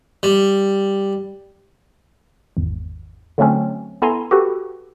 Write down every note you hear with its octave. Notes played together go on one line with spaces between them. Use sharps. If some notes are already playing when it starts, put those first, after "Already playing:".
G3
G#1 E2
D3 F#3 A3 C4 C#4
B3 E4 A4 G#5 A#5 C6
F#4 G4 A4 B4